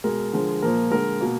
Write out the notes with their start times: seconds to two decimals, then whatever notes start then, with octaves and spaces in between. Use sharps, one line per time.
0.04 B2 G#3 A#4
0.33 D3 F3 G#3
0.62 A#2 F3 A#3 A#4
0.91 D3 G#3 A#4
1.21 B2 A#3